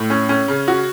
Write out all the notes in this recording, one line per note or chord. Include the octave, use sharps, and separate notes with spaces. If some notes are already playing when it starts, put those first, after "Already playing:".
Already playing: A2
C#4
C#4
C#3
F#4